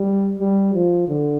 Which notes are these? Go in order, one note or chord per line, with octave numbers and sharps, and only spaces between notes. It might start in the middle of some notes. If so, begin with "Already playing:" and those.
Already playing: G3
G3
F3
D3